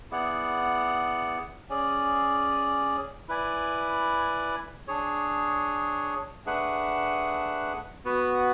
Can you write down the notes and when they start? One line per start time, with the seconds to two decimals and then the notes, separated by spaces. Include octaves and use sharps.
0.11 B3 E4 G#4 D5 F#5
1.69 C#4 G#4 D5
3.29 E4 B4 D5 G#5
4.88 D4 G#4 C#5
6.46 A3 D4 G#4 B4 F#5
8.05 B3 F#4 B4